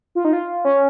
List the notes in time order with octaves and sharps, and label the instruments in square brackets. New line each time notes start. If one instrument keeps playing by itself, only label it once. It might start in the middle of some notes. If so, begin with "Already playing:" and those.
[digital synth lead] F4
D#4
F4
C#4